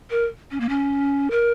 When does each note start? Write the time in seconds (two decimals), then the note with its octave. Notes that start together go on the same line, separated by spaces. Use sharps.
0.11 A#4
0.51 C#4
0.60 A#3
0.69 C#4
1.31 A#4